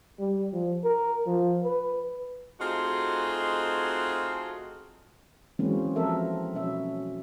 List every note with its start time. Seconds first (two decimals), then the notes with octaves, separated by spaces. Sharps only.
0.19 G3
0.53 F3
0.84 A#4
1.26 F3
1.64 B4
2.60 A3 C4 D#4 F4 F#4 G#4
5.59 E3 F#3 G#3 A#3 C4 C#4
5.96 F3 C4 A4 A#4 E5
6.54 B2 F#3 C#4 E5